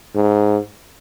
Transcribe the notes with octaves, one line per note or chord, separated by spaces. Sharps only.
G#2